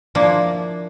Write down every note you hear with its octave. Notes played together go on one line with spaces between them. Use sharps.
F3 A#3 D4 E4